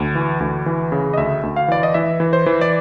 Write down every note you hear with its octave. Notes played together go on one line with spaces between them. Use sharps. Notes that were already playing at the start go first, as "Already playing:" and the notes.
Already playing: D2
E3
D2
E3
C#3
D#5
D2 E5
D2
F5
E3 D5
D#5
E3 E5
E3
C5
E3
D5